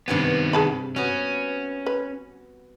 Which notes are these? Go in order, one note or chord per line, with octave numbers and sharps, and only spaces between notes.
G2 C3 D#3 B3 G#5
G#4 A5 B5
B3 C#4 F#4
B4